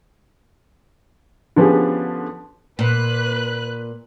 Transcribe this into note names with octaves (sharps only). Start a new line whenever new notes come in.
D3 F3 B3 C#4 G4 G#4
A#2 B4 F#6